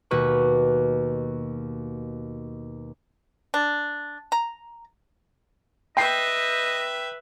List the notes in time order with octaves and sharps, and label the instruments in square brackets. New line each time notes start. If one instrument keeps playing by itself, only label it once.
[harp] D#2 B2 B4 C#6
[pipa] D4
A#5
[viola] B4 E5 [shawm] D#5 [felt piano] G5 C7